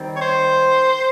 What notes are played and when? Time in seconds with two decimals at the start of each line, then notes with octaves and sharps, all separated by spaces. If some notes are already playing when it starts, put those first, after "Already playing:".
Already playing: D#3 G3 C4
0.16 C#5
0.21 C5